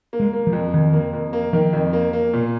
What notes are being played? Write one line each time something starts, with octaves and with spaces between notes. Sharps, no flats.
A#3
G#3
A#3
F3
F2
F2 D#3
A#3
F2
A#3
D#3 F3
F2
A#3
A#3
A#2